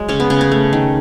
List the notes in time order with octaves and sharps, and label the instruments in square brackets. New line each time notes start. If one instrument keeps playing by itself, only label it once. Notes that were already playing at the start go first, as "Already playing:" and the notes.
Already playing: [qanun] F#3 G#3
C#3 C#4
B3
C#3 C#4
C#4
A3
D#3